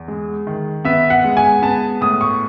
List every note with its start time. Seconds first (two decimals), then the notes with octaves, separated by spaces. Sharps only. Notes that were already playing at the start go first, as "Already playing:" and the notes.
Already playing: E2
0.08 G#3
0.47 D#3
0.85 B3 E5
1.10 F#5
1.24 G#3
1.37 G#5
1.62 B3 A5
2.01 A2 D#6
2.21 C#6